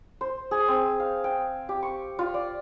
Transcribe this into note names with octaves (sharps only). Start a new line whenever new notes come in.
C5
G#4
C4
F5
G5
G4
C#6
F4
D5